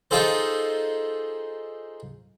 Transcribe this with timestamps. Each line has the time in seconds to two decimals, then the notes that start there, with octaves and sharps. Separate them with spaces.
0.11 D#4 F4 G#4 A4 C5